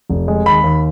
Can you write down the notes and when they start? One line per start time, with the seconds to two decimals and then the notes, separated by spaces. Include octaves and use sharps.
0.10 F1
0.28 G#3
0.46 D#2 B5
0.64 D#2